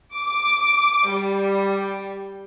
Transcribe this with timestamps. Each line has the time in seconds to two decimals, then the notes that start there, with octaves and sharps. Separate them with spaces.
0.14 D6
1.08 G3